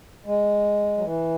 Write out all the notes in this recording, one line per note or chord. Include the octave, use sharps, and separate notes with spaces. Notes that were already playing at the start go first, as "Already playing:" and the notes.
G#3
F#3
E3